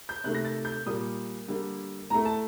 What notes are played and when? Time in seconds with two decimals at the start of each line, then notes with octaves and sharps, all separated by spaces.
0.09 G6
0.24 C3 D#3 A3 F#6
0.35 A#6
0.45 A6
0.65 G6
0.86 A#2 G3 A#3 D#6
1.48 D3 G3 A#3
2.10 A2 A3 A#5
2.25 A5